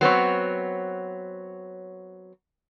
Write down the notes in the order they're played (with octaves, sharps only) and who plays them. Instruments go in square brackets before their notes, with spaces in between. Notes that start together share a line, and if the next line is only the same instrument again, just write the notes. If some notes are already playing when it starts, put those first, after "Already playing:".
[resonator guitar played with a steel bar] F#3 B3 C4 C#5